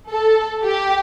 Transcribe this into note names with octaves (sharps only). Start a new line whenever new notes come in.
A4
G4